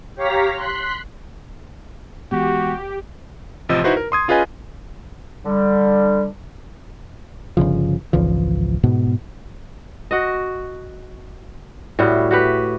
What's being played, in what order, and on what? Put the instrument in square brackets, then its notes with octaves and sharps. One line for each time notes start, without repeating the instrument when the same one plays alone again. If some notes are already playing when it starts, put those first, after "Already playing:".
[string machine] G4 C#5 F5 A#5 A#6 B6
C6 F#6 B6
[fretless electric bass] E3 G#3 B3 [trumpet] F#4 [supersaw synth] G4
[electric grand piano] A1 C3 F3 D#5 E6
D#4 E4 F#4 B4 C5
A#4
C6 D#6 G#6
C#4 F4 G#4 B4 D#5 G#5
[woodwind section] D3 G3
[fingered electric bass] G1 D#2 C#3 F3
G#1 C#2 E3 F3
G#2 B2 B3
[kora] F#4 D#5
A2 G3 E4 F#4
F#4 G4 B4